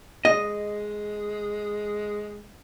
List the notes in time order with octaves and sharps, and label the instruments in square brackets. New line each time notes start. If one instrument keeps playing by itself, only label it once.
[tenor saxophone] G#3 [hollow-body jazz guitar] D#5